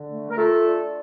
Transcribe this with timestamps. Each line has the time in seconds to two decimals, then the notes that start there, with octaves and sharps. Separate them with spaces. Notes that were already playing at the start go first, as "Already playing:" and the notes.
Already playing: D3
0.08 A3
0.30 A#4
0.37 A3 F4 A4
0.66 D3